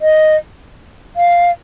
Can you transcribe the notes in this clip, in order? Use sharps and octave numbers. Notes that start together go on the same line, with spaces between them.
D#5
F5